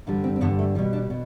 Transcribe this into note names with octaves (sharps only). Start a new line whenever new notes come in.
G2 D3 G3
C4
C4
G2 D3 G3 B3
A3
B2 G3 B3
D4
B2